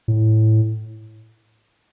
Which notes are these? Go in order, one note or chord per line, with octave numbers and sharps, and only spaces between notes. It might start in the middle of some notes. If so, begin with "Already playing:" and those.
A2